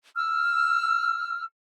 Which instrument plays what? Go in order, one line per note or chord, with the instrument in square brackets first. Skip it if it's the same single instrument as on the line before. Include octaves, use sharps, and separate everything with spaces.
[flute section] E6 F6